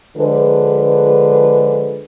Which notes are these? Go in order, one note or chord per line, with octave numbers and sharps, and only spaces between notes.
D3 F3 G#3 G#4 B4